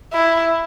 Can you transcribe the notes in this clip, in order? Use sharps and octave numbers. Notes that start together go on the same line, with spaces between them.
E4